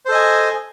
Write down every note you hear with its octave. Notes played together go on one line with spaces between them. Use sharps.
A4 C5 D#5 G#5